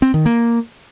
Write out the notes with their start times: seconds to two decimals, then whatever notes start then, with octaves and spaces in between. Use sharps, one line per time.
0.02 C4
0.14 D#3
0.26 A#3